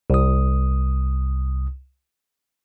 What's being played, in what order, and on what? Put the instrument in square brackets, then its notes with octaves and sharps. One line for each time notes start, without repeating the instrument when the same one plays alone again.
[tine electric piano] C2 D#6